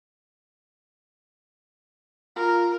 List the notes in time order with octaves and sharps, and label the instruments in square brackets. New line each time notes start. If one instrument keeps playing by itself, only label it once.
[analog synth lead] F4 [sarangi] A#4